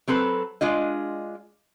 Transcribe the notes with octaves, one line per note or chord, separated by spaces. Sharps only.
F#3 C4 A4 B4
G#3 D4 F4 D#5